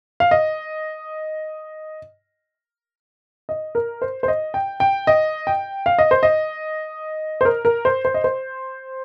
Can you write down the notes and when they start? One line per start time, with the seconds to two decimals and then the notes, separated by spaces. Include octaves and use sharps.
0.20 F5
0.31 D#5
3.49 D#5
3.75 A#4
4.02 C5
4.23 C5
4.28 D#5
4.54 G5
4.80 G5
5.07 D#5
5.47 G5
5.86 F5
5.99 D#5
6.11 C5
6.23 D#5
7.41 C5
7.45 A#4
7.65 A#4
7.85 C5
8.05 C5
8.14 D#5
8.24 C5